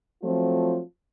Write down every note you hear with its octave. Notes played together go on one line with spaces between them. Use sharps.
F3 F#3 A3 C4 F4